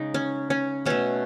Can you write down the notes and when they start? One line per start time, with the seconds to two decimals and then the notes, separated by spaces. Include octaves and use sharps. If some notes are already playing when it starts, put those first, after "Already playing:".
Already playing: C#3 G#3 D#4
0.14 C#4
0.50 C#4
0.86 B2 A3 C#4